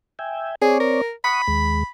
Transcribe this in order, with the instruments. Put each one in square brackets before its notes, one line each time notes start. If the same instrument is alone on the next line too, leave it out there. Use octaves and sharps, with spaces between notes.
[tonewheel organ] E5 G5 G#5
[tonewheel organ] C4 C#5 D5 [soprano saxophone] G#4
[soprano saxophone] A#4
[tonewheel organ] F#5 C#6 D#6 [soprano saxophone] B5
[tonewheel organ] D#2 G#3